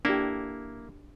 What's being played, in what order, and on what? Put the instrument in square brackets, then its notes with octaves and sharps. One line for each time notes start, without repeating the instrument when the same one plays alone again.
[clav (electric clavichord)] A#3 E4 [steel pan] D4 G4